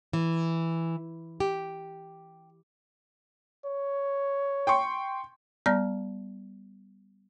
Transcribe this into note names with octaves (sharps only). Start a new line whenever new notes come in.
E3
G4
C#5
G5 C6 C#6
G3 B3 D5 A#5 F6 A#6